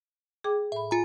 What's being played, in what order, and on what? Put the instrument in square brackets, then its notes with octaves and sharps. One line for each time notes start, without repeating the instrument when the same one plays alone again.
[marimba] G#4 G5 D6
[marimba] A2 B5 [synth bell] E5
[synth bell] F4 A#5 [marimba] G#5